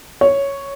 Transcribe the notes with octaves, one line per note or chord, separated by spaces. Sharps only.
C#5